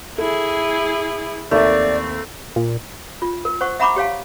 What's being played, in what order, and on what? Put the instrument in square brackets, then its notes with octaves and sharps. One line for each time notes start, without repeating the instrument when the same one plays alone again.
[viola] E4 G#4 [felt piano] A4
[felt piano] D#2 E5 [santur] A3 [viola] C4 [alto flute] D5
[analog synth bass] A#2
[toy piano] F4
A#4
C5 F#5 C#6
E5 F#5 A#5 B5 C#6 D6
G4 C#5 F5 G#5